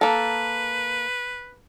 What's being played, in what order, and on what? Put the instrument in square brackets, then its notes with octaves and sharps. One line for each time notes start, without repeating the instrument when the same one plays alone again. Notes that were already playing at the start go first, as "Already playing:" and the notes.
[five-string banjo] A#3 A4 [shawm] B4